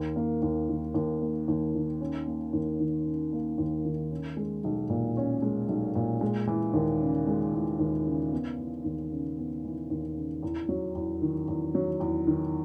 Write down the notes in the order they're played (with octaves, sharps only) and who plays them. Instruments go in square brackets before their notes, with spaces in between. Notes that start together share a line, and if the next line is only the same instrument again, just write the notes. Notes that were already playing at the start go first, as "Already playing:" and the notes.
Already playing: [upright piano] D#2
A#3
D#2
D#3
D#2
A#3
D#2
D#3
C#4
A#3
D#2
D#3
C#4
A#3
D#2
D#3
C#4
G#3
B1
A#2
C#4
G#3
B1
A#2
G#3
E3
D#2
C#3
G#3
E3
D#2
C#3
B3
E3
D#2
C#3
B3
E3
D#2
C#3
E2
F#3
E2
D#3
E2
F#3
E2
D#3